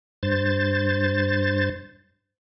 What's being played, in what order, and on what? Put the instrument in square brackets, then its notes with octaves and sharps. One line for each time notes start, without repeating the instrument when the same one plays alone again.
[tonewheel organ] G2 C5 A6